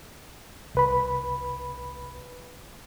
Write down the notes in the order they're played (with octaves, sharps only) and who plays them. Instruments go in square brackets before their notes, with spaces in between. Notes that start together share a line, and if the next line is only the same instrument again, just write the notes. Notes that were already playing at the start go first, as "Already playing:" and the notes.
[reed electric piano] C2 B4 B5